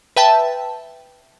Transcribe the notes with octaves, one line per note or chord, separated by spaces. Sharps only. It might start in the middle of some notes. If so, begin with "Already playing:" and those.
B4 E5 G5 A5